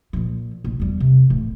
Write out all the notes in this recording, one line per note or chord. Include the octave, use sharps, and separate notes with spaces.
A#2 F3
A#1
E2 G3
C3
D1 A1